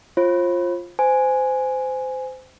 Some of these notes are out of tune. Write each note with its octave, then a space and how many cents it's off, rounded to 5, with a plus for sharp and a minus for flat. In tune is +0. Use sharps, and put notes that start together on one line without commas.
F4 +0 C5 +40
C5 -25 G#5 +0